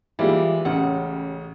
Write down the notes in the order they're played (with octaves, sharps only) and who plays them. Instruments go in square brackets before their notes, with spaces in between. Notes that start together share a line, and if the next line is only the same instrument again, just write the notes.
[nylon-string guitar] E3 [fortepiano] G3 G#3 A#3 [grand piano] E4 F4 D5
[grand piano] A1 C#3 [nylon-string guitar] F#5